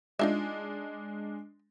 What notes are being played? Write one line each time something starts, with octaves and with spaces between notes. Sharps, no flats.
G#3 D4 D#4 F4 E5